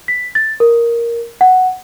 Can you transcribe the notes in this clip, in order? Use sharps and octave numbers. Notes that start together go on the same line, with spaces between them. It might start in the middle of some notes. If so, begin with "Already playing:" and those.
B6
A6
A#4
F#5